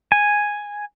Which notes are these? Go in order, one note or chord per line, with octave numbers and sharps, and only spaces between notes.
G#5